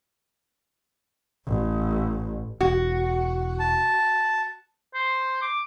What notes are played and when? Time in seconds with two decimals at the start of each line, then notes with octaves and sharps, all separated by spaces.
1.47 A1
2.61 E1 F#4
3.59 A5
4.94 C5
5.42 D6